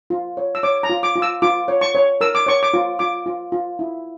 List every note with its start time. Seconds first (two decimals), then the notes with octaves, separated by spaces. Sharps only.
0.10 F4
0.37 C#5
0.55 E6
0.63 C#5 D6
0.83 A#5
0.90 F4
1.03 D6
1.16 F4
1.22 E6
1.42 F4 D6
1.68 C#5
1.81 C#6
1.95 C#5
2.21 A#4 E6
2.35 D6
2.46 C#5 C#6
2.63 D6
2.74 F4
2.99 F4 D6
3.26 F4
3.52 F4
3.79 E4